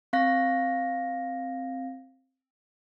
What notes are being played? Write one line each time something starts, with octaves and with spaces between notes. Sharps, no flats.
C4 F5 A#6